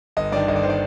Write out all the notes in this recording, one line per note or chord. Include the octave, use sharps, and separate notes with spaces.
G1 D#5
G2 D#3 D5
G1 D#5
D5
D#3 C5
D5